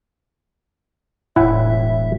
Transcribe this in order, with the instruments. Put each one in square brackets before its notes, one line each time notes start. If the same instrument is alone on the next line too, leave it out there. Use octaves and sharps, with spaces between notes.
[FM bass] E1 [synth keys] A2 [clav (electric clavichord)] E4 F#5 G#5 [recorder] E5